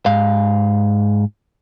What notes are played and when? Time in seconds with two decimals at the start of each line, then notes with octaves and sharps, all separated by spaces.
0.06 G#2 F5